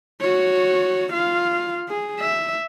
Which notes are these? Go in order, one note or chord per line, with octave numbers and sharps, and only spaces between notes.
F#4 C#5
F4 F5
G#4
E5